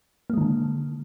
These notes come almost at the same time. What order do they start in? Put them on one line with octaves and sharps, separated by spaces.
A#3 G#3 D#3 D3